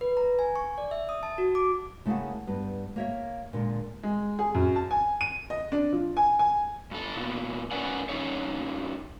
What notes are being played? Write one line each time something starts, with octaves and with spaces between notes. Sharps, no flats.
B4
A#5
G#5
C#6
D5
E5
D#6
A5
F#4
D6
C#3 A3 A#3 E4 G#4 F#5
G2 G3 B3
A#3 C#5 E5
A#2 D3 G#3
G#3
G#4
F#2
A5
G#5
D#7
D#5
D4
F3
G#5
G#5
G2 A4
A#2 B3 E4
C#4 A#4 B4 D5 F#5 G#5
G2 G3 C#4 D#4 A4 C#5